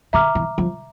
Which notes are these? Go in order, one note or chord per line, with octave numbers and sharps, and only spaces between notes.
D3 E5 A#5 D6 F6
E3
F3